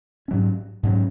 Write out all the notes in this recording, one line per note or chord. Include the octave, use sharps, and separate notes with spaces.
G#2 F#3 C#4
G#2 F#3 C#4